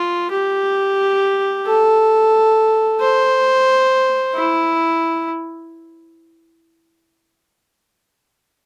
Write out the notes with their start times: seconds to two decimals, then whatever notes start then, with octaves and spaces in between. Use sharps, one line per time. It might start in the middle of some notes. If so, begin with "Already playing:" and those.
Already playing: F4
0.32 G4
1.66 A4
3.00 C5
4.35 E4